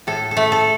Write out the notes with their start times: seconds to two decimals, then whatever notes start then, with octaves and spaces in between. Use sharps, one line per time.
0.07 A2 A4
0.31 A4
0.37 A3
0.52 A4